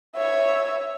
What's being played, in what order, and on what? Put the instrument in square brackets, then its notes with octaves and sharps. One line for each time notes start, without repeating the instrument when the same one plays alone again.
[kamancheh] C#5 E5